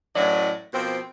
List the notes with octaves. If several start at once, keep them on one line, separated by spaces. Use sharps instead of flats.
F#2 A2 E3 F#3 D5 D#5
B2 F3 A#3 C4